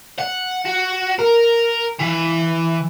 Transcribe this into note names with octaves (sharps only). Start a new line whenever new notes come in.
F#5
F#4
A#4
E3